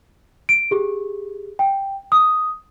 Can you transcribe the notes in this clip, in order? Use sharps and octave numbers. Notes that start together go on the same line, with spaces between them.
D7
G4 G#4
G5
D#6